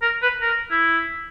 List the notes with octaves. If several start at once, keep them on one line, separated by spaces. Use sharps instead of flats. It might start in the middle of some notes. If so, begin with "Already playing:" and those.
A#4
B4
A#4
E4